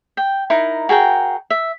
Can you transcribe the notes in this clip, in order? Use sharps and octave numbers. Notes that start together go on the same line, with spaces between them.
G5
D#4 E4 A#4
F#4 G#4 A#4 G5
E5